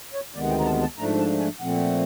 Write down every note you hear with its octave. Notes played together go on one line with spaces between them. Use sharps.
C#5
D2 C3 D#3 G#3 B3 D5
F#5
G5
A#5
A5
A5
G#2 F3 A3 D4 A#5
A5
G#5
A#2 F3 A3 C4 F#5